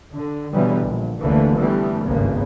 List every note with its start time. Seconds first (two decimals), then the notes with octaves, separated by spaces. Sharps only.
0.14 D3
0.53 B2 D3 E3 F#3 G3 B3
0.83 A#1
1.21 F1 D2 D3 E3 A3 A#3
1.57 D3 E3 G3 A3 B3
2.06 G#1 D2 G2 C#3 A#3 B3